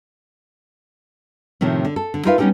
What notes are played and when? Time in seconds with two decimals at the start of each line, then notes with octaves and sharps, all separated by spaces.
1.61 A2 C3 D#3 F3 A3
1.85 D3
1.96 A4
2.14 D3
2.25 D#4 F4 A#4 B4 E5 F5
2.38 G3 B3 C#4 D#4 G4 A4